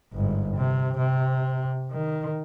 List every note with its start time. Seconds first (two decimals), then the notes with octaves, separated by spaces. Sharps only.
0.14 G1 G#2
0.56 C3
0.98 C3
1.91 D#3